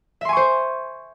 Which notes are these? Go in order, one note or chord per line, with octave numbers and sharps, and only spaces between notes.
C5 E5 G#5 C6 C#6